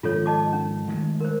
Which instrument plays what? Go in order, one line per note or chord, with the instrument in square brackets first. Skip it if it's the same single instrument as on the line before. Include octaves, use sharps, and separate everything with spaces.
[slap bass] G#2 D#3 F3 [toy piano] F4 A4 C#5
[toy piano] D#5 A5 D6
C#4
[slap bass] D#3 G#3 A3
[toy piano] A#4 C5